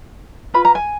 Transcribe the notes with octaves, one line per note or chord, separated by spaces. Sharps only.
F4 B4 B5
A#5
G#5